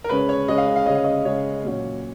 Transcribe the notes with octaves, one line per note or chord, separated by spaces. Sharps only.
A#4
C#3 G#3 C#4 B4
C#5
C#3 G#3 C#4 D#5
F5
D#5
F5
C#3 G#3 C#4 D#5
F5
D#5
C#3 G#3 C#4 C#5
A#2 F#3 A#3 C#4